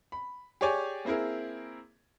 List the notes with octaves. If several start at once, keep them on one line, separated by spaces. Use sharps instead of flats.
B5
G4 G#4 C#5 D5 G#5
A#3 C4 E4 G#4 A#4